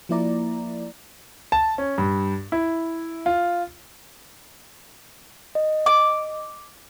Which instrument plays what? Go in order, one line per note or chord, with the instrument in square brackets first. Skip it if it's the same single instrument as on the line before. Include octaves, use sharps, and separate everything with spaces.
[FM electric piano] F3 A#3 E4 D5 A#5
[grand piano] A5
C#4
G2
E4
F4
[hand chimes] D#5
[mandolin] D6